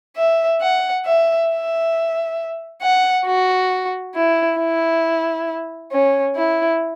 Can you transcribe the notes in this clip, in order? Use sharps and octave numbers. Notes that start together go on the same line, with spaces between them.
E5
F#5
E5
E5
F#5
F#4
E4
E4
C#4
E4